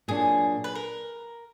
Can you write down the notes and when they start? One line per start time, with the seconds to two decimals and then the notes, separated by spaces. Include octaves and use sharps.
0.08 A#2 F#3 D4 G#4
0.64 B4
0.75 A#4